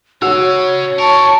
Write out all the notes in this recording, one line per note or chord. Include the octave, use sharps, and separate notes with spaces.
C#3 F#4 C#5 F5 E6
F2 A#4 A5 C#6